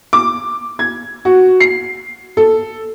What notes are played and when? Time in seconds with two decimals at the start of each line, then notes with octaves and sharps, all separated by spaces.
0.13 D6
0.79 G#6
1.25 F#4
1.60 C7
2.37 A4